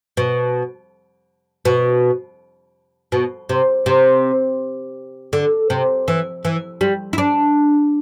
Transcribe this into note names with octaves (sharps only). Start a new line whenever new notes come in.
B2
B2
B2
C3
C3
D3
C3
E3
E3
G3
E4
D4